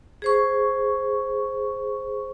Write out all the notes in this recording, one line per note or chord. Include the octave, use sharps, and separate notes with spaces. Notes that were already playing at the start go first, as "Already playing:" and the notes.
G#4 C5 C#6